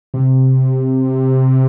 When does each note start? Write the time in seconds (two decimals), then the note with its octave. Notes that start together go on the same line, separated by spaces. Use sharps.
0.14 C3